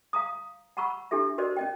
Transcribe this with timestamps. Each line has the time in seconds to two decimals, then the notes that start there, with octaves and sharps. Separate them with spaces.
0.13 F5 A#5 D#6
0.77 F#5 A#5 B5 C#6 E6
1.11 D4 E4 G4 A4 E5
1.38 F#4 A#4 C5 D5 D#5
1.56 C#4 D#5 G5